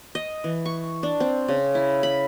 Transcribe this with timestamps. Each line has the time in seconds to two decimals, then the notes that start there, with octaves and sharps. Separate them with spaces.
0.15 D#5
0.44 E3
0.66 C#6
1.03 D4
1.20 C4
1.48 C#3
1.75 E4
2.03 B5